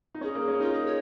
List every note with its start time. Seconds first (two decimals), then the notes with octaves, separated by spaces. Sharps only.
0.15 D#4
0.21 C#4 G#4
0.35 A#3
0.48 C#4
0.60 D#4 F4
0.73 G#4
0.85 C#5